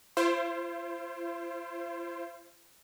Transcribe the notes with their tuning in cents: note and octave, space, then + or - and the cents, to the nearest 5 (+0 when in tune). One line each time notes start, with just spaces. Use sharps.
F4 -45 C5 +10